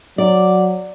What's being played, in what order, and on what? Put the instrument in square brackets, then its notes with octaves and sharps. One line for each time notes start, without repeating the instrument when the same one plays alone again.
[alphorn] F#3 [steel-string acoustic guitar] D5